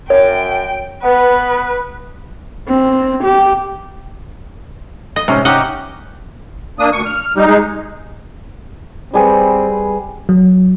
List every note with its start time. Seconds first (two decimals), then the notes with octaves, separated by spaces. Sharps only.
0.10 F#2 C#5 G5
1.04 B3 B4
2.68 C4
3.24 G4
5.16 D#5
5.28 G#2 C3 C#4
5.45 C#4 D#4 G4 D#5 F#5
6.79 A#3 D4 D#6
6.93 D2 C#6
7.06 F6
7.36 G3 D#4
7.48 G#3
9.14 G3 C4 G#4 B4
10.29 F#3